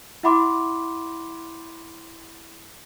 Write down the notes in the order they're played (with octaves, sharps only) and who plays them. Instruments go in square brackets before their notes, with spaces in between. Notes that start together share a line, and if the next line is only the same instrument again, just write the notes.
[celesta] E4 E5 F#5 B5 C6 D6